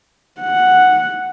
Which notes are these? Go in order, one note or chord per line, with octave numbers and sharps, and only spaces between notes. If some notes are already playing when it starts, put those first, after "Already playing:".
F#5